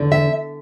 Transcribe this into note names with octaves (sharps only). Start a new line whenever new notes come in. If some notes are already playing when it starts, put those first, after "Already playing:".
Already playing: E2 D3
E5